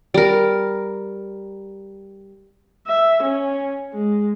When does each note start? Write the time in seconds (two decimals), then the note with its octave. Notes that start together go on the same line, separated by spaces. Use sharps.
0.14 G3 A#4
2.87 E5
3.23 C#4
3.93 G#3